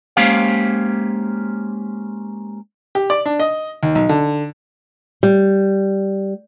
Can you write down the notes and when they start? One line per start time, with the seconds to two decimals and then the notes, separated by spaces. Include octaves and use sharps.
0.17 G#3 A#3 C#4 G4 C5 F5
2.95 G4
3.10 D5
3.26 D4
3.40 D#5
3.83 D#2
3.95 B1
4.09 D3
5.23 G3